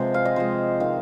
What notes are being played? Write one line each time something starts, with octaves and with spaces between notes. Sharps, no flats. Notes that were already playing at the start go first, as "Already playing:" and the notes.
Already playing: C3 F3 G#3 C4 C5
F5
D#5
C3 F3 G#3 C5
D#3 C4 F5